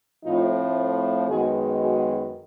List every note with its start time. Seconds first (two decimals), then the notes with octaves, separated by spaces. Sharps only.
0.24 A2 F3 A3 C4 D#4 F4
1.28 F#2 D#3 G#3 B3 F#4 G#4
1.81 F#4 G#4